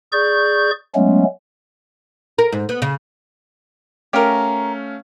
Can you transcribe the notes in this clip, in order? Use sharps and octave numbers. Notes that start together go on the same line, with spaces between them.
G#4 D5 C#6 G6
F#3 G#3 A3 B3 C#4
A#4
G#2
B3
C#3
A3 C#4 G4 A#4 F5